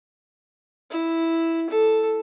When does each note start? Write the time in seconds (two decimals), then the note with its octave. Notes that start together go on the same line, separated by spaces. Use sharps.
0.91 E4
1.70 A4